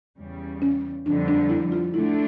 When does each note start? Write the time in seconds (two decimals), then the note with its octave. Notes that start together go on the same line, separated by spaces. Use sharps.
0.18 E2 C#3 G3
0.62 C#4
1.06 F2 D3 G3 D4
1.28 D4
1.50 E4
1.72 F4
1.93 D3 A3 D4 E4